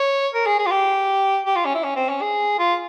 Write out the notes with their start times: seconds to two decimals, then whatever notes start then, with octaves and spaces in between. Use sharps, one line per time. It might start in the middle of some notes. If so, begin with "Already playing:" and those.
Already playing: C#5
0.33 A#4
0.46 G#4
0.58 G#4
0.66 F4
0.71 G4
1.46 G4
1.56 F4
1.65 C#4
1.75 E4
1.84 C#4
1.96 C4
2.09 C#4
2.22 G#4
2.59 F4